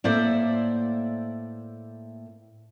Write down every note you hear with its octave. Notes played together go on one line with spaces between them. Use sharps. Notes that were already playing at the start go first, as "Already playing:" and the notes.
A2 A#3 C5 D5 E5